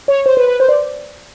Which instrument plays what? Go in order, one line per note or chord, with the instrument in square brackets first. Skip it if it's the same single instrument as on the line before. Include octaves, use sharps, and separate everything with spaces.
[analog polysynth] C#5
C5
B4
B4
C5
D5